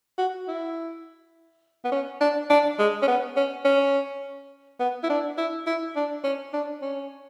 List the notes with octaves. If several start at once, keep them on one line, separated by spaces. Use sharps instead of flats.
F#4
E4
B3
C#4
D4
D4
G#3
C#4
B3
C#4
C#4
B3
E4
D4
E4
E4
D4
C#4
D4
C#4